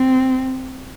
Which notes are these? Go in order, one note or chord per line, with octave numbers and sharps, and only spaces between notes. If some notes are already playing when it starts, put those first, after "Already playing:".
Already playing: C4